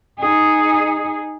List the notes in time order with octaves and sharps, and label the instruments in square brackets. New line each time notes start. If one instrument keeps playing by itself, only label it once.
[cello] D#4 G#4